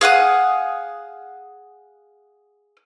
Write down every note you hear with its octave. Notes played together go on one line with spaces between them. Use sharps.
G#4 F5 F#5 D#6